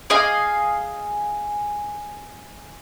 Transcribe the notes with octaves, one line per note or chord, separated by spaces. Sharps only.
G#4 D#5 F5 G#5